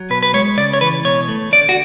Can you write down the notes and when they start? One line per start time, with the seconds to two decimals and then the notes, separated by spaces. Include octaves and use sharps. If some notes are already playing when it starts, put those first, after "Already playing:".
Already playing: F#3
0.10 B2 B4
0.23 B4
0.33 G#3 C#5
0.57 C#3 D5
0.73 C#5
0.81 E3 B4
1.04 B2 C#5
1.28 A3
1.52 D3 D5
1.69 F#4